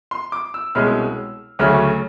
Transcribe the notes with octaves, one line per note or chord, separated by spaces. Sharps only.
C6
D6
E6
C2 B2 G#3 C#4 F6
D2 C#3 F#3 A3 C#4 F6